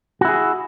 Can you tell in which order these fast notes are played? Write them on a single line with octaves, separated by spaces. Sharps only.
F#4 E4 G#4